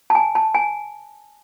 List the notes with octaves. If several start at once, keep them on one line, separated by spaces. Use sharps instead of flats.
A5
G#5
A5
G#5